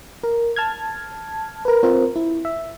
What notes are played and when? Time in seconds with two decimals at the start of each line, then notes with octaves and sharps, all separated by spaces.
0.23 A#4
0.56 A5 F6 G#6
1.65 A#4 B4
1.83 C4 F4 A#4 C5
2.16 E4
2.45 E5